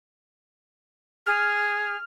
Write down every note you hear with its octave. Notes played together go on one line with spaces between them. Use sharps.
G#4 F6